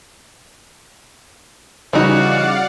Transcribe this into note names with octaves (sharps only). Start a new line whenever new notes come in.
C#3 E3 G3 D#4 F#4 D5 F5 F#5